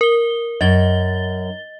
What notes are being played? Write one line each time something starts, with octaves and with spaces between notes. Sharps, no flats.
A#4 G7
F#2 D#5 A6 G7